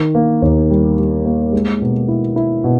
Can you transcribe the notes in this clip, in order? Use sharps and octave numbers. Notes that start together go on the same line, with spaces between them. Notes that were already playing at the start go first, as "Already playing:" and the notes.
Already playing: D#3
A#3
D#2
G3
G3
A#3
G#3
B2
E4
E4
B2